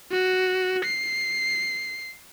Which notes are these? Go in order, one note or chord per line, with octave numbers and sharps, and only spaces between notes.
F#4
C7